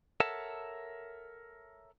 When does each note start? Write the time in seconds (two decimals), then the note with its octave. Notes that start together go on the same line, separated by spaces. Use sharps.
0.20 A4 A#4 C#5 E5 F#5 A5